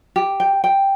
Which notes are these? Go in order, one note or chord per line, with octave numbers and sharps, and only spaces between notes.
G4
G5
G5